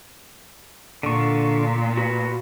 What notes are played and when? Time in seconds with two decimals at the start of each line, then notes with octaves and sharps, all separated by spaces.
1.03 A#2 D3 C#6
1.97 F#4 B4